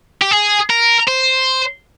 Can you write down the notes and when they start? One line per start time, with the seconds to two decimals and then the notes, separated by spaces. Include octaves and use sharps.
0.22 G4
0.31 G#4
0.70 A#4
1.08 C5